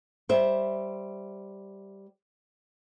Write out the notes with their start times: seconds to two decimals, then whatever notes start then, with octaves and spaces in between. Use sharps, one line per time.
0.29 G3 C5 E5